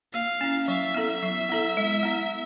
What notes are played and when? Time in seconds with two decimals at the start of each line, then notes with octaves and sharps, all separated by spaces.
0.13 A#3 F5
0.41 C#4 E4
0.68 F#3 E5
0.95 B3 E4 A4
1.23 F#3
1.50 B3 E4 A4
1.77 G#3
2.03 B3 E4